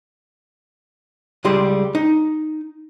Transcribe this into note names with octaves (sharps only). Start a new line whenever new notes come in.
C#2 G3 G4 G#4 C6
D#4